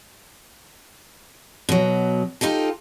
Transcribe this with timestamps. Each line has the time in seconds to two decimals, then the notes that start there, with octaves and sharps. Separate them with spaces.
1.69 B2 F#3
2.41 D#4 F4 G4 A4